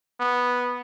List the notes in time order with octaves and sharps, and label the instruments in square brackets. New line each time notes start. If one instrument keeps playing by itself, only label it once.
[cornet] B3